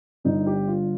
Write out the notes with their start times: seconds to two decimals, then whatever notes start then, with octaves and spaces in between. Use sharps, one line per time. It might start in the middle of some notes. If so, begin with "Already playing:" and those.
0.24 G1 G2 D3 G3 D#4
0.46 G4
0.68 F4